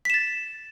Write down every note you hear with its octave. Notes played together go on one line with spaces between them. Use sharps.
A6 B6 E7